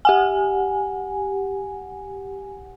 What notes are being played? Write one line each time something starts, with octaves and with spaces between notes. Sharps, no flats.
G4 F#5 G#5